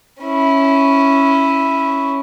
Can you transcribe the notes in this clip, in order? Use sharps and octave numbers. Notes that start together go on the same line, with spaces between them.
C#4 E4